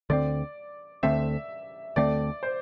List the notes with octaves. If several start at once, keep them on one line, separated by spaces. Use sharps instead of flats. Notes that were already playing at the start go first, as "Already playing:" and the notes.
D2 D3 A3 C4 D5
D2 D3 A3 C4 E5
D2 D3 A3 C4 D5
C5